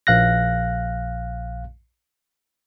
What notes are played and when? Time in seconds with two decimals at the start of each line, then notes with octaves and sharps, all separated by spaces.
0.07 A#1 F5 F#6 A#6